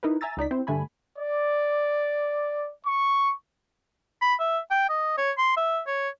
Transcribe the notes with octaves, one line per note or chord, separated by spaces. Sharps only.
D#4 E4 A#4 B4
E5 G#5 A#5 E6 A6
C#2 D#4 D5 B6
C4 E4 C5
G2 D3 A3 G#5 B5
D5
C#6
B5
E5
G5
D#5
C#5
C6
E5
C#5